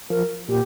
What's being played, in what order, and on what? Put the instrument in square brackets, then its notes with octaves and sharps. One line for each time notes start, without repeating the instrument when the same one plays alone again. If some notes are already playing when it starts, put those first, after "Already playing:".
[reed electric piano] F3 [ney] A#4
[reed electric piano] A#2 [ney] G4